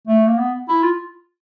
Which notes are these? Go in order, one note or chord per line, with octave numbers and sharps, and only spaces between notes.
A3
A#3
B3
E4
F4